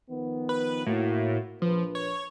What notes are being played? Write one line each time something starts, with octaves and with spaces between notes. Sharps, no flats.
D#3 F3 B3
B4
A2 A#3 E4 F#4
A#1 F3 B4
C#5